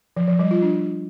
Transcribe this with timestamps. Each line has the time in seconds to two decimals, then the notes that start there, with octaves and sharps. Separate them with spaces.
0.17 F3
0.28 F3
0.39 G3
0.51 F4
0.62 D4